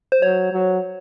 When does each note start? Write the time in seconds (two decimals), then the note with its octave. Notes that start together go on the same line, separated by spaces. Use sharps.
0.12 C5
0.22 F#3 C#5
0.52 F#3